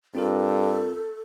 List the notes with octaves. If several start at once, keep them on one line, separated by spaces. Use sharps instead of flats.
G2 C4 F4 A4 A#4